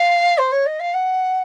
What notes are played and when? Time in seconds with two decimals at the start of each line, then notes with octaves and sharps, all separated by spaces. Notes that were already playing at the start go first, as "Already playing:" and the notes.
Already playing: F5
0.38 C5
0.52 C#5
0.66 D#5
0.79 F5
0.93 F#5